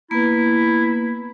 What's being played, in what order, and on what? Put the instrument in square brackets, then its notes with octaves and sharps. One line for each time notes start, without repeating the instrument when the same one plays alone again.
[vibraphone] A#3 B3 B4 [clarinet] E4